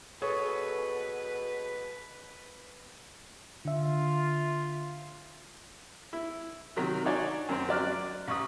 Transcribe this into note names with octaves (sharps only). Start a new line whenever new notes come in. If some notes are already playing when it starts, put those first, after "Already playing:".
B2 G#4 A4 B4 C#5
D3 F4 E5
E4
C3 D#3 F#3
D4 D#4 F#4 C#5 D5 G#5
F#2 C4
F#3 D5 F6 F#6
A1 C#6 D#6